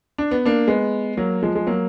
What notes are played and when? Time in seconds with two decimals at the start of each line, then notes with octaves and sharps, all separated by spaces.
0.18 D4
0.31 B3
0.45 A#3 D4
0.68 G#3 B3
1.17 F#3 A#3
1.43 F3 G#3
1.55 G#3
1.67 F#3 A#3